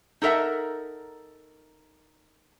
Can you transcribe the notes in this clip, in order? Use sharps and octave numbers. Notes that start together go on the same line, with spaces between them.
D#4 A4 A#4 E5 F#5